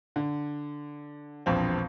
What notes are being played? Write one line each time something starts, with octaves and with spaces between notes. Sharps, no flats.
D3
E1 A#1 F3 C4